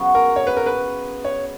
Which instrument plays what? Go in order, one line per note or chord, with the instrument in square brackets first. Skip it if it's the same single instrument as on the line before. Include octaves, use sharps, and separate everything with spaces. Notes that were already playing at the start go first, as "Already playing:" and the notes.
Already playing: [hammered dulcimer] C#3 F#3 B3 F#4
[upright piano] A#4
C#5
B4
A#4
B4
C#5